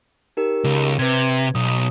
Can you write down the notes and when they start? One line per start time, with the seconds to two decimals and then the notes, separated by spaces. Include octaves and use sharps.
0.37 D#4 G4 A#4
0.64 C#2
0.99 C3 B4 G#6
1.55 B1 D#6